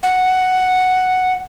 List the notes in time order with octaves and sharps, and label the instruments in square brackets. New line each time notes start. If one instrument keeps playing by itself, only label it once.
[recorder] F#5